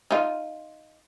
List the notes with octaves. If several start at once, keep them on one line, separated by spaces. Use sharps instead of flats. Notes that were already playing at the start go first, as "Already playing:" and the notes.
D#4 F4